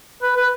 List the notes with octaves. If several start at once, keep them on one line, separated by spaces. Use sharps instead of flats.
B4
B4